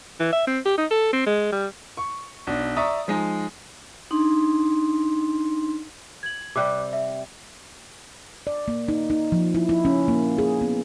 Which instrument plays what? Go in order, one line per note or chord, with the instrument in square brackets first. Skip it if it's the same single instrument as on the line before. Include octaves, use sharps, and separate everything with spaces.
[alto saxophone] E3
E5
C4
G4
D#4
A4
C4
G#3
G3
[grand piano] C#6
B1 D4
D5 E5 A#5 C#6 D#6
F3 G#3 D#4
[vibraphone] D4 D#4 C6
[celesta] G#6 F#7
[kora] C3 G3 G4 [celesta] D6 F#6
[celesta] E5
[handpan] D5
A#3
D#4
D#4
F3
E4
E4
C#4
A#3
G#4
B3